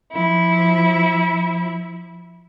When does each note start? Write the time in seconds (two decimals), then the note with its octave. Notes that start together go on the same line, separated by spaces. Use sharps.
0.13 F3 E4